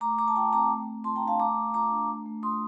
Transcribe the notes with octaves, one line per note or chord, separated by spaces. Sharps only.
A3 A#5 D6
A3 A#5 D6
A5
F4 G5 A#5
C4 A#5 D6
A3
A3
F4 A5 C6
G5 A#5
D4
F5 A5
A3 A#5 D6
A3
F4 A#5 D6
D4
A3
A3
F4 C6 D#6